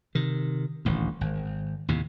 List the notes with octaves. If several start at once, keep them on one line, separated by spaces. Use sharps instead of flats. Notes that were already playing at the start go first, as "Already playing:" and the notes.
C3 D#3
D#1 A1 D2
G#1
D#2 A2 C3